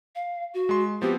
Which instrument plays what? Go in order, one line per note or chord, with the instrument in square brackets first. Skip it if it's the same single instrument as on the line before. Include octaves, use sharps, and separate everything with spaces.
[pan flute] F5
F#4
[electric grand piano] G#3 C6
[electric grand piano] F3 B3 C4 [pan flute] G4